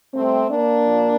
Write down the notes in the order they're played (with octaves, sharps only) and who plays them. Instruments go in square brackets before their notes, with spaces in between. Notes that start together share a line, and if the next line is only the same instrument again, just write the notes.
[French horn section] C3 G3 A3 C4
A#3 D4
A#2 F3